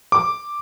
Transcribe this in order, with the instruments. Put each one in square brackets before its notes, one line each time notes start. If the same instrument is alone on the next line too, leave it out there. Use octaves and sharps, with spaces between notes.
[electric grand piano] D6